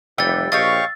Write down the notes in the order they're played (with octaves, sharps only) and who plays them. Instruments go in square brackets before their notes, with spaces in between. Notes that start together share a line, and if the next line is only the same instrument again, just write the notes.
[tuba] F1 [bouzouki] E3 G3 G5 [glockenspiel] E6 A6
[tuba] A#1 [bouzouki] G4 C#5 D#5 [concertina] F5 C#6 [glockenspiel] A6